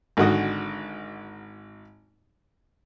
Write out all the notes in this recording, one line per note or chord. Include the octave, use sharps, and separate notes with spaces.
G#1 D3 D#3 F#4 D#5